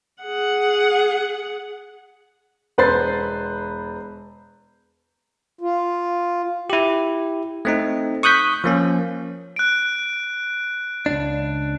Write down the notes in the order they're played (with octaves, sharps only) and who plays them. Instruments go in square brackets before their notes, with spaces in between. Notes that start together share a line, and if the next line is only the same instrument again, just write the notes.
[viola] G#4 F#5
[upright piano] E1 B4 C5 A6 C7
[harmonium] F4
[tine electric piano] E4 G4
A3 C4 D#4
C#6 D#6 F#6 G6 B6
F3 A#3 C#4
[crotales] F#6 D7
[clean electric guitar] C#2 F#2 D4